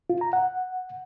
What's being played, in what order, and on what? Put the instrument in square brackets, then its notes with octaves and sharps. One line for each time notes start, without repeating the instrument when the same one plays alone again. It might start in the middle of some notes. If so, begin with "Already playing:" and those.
[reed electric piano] F4
A#5
F#5